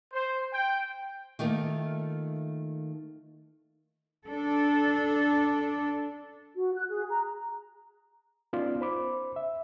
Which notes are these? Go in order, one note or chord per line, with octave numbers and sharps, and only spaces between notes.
C5
G5
D#3 A3 A#3 F4
D4 A4
F#4
F#6
G#4
A#5
B3 C#4 D#4 F4 D5
C5 B5 D6
E5